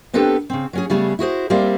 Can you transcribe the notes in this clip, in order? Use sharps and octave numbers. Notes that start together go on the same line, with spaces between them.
B3 C4 D4 G4 A4 B4
C#3 C4
F#3 C#4 G#4
C#3 G3 A3 B3 G#4
E4 F#4 G#4 C5
G3 A#3 C4 C5 D5 E5